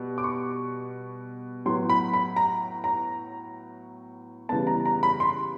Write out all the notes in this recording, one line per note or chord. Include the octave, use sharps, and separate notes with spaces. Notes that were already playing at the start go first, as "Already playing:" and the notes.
Already playing: B2 G3
D6
C#6
A2 F#3 B3 C6
B5
B5
A#5
A#5
C#3 E3 G3 B3 A5
A#5
A#5
B5
C6